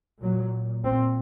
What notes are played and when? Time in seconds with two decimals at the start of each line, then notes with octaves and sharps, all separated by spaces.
0.22 A#2 F#3
0.84 A#2 C4